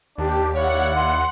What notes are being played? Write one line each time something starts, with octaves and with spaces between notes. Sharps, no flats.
D#2 D4 G4
E4 C#5 D5 F5 F#5
C6